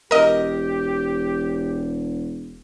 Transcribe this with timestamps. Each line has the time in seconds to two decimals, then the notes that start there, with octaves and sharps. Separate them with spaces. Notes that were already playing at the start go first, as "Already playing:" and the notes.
0.11 E1 G4 A#4 D#5